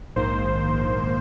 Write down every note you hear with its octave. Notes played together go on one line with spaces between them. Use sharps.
A#1 G#2 D#3 A#3 C5